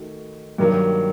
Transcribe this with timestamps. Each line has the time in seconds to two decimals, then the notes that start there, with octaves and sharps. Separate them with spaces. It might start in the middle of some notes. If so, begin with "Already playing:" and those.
Already playing: D#3 A3 D#4 F#4
0.58 G2 D#3 F#3 A#3